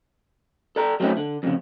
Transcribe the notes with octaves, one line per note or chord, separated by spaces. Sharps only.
A4 D5 A#5
F#3 A3 C4 C#4 D#4 E4
D3
F2 A#2 C#3